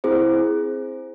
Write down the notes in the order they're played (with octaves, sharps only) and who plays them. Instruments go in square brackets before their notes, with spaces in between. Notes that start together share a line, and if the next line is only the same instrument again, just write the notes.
[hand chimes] C4 E4 G#4 C5